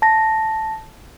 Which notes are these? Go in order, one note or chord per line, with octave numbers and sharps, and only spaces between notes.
A5 A#6